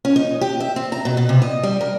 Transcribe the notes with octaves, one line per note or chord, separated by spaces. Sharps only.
C#4
D#4
G4
E5
C4
A#5
B2
B2
C3
D#5
G3
A#4